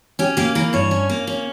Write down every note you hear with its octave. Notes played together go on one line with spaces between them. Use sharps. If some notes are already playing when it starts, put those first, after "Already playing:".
C#4 G4
A#3 G4
E3 A#4
G2 C#5
C#4
A#3
C#4